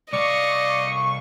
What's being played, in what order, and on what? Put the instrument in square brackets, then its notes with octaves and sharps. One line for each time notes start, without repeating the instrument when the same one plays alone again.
[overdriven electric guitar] C2 F5 [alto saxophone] D5 [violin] D#5 [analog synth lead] C#6